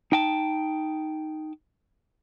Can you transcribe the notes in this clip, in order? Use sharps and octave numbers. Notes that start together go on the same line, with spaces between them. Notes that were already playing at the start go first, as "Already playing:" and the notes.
D#4 G5 A5